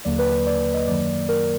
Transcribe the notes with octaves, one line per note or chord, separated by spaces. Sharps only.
D#2 D3 F#3 A#3 D5
B4
B4
D5
D#5
F#2 D#3 F#3 A#3 D5
A#4